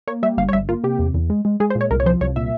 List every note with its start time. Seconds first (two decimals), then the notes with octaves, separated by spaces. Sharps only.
0.07 A#3 C#5
0.23 G3 E5
0.38 G1 F5
0.49 C#5
0.53 G1 E5
0.69 A#3 F4
0.84 C3 G4
0.99 E2
1.14 E2
1.30 G#3
1.45 G#3
1.60 G#3 G#4
1.70 C5
1.75 A#2
1.81 C#5
1.91 C2 A#4
2.00 C#5
2.06 F3 C5
2.21 C2 C#5
2.36 A#2 E5